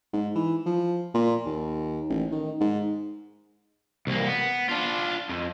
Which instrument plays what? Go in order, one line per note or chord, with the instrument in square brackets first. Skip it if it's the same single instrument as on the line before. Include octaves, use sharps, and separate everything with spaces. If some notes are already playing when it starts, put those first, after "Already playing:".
[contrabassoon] G#2
E3
F3
A#2
D#2
A1
D#3
G#2
[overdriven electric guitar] C2 A#3
B3
D4 F4
F2